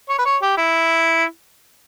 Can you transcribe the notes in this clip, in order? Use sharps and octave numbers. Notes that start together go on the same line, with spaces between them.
C#5
B4
C#5
G4
E4